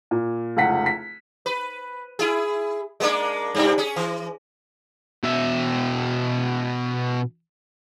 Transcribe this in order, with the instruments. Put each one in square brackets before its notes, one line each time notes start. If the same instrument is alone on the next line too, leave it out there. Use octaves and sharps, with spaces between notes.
[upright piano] A#2
F1 C#2 F#5 B6
B6
[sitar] B4
E4 G#4
G#3 A#3 D4
G2 C3 D4
C#4 G#4
E3
[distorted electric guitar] B2 E5